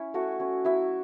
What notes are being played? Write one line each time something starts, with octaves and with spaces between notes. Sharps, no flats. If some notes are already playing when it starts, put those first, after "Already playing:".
Already playing: C#4 E4
A3 F#4 F#5
C#4 E4
F#3 E4 E5